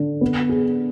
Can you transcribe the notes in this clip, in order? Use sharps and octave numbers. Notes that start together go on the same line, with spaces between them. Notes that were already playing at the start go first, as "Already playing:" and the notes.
Already playing: D3
B3
G#4